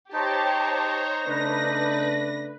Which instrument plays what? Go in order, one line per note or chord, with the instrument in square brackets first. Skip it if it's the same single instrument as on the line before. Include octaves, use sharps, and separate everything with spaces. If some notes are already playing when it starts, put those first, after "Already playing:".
[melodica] D#4 [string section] G4 A5 [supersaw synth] C5 C#5 A#5
[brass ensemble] C#3 A3 D4 [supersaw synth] B4 [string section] A#6